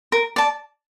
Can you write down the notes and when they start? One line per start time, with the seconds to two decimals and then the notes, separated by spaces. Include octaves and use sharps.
0.12 A#4
0.36 D5 A5